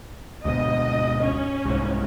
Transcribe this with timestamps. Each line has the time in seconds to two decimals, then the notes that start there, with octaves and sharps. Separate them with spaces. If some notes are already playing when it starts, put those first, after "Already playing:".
0.45 D2 G#2 B2 D#5
1.22 C#4
1.65 C2 G#2